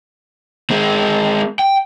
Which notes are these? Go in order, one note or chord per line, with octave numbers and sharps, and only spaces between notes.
G#3 C4
G5